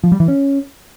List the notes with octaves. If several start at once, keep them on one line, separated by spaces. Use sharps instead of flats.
F3
G3
E3
C#4